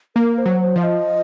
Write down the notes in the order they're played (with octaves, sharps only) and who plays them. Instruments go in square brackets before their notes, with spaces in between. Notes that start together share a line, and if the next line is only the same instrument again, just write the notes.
[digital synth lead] A#3 [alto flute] A#4
[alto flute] C5
[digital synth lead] F#3
[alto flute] C5
[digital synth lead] F3 [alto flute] F5
[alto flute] D#5